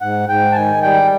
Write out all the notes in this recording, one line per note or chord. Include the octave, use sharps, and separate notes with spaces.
G#2 F#5
G#2 G5
A5
D#3 G#5
G3 G5